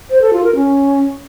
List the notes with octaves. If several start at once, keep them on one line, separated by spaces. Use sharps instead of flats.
C5
A4
F4
A#4
C#4